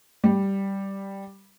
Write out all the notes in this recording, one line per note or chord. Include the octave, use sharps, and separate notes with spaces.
G3